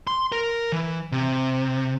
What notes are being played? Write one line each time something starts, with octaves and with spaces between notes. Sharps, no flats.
C6
A#4
E3
C3